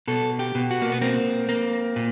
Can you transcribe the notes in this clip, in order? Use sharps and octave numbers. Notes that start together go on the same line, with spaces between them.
B2 A4
G4
B2
F#4
A#3
B3
A#3 C4
A#3
A#2